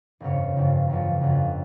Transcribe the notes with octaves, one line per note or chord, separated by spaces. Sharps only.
G1 F2 C#3 F3 C#5
G1 F2 C#3 F3
G1 F2 C#3 F3 C#5
G1 F2 C#3 F3